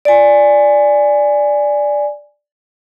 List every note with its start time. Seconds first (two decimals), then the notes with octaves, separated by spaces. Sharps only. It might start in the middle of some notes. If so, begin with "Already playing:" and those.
0.05 D5 G#5